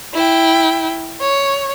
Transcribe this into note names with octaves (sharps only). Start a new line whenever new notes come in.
E4 G5
C#5